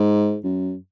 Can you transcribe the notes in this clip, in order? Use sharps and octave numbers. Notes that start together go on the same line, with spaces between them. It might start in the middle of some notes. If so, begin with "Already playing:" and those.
Already playing: G#2
F#2